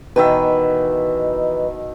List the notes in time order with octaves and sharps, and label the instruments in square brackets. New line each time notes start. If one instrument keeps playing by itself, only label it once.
[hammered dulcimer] B2 D#3 E5 [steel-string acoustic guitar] E3 B4